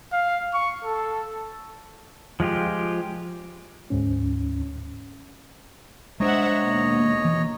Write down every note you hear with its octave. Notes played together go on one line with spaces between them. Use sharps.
F5
C#6
A4
F3 G#3 F4 G4
D2 G#2 C#4
G#3 D4 C5 C#5 D#5 E5 F#5 A#5
D#2 B2
E3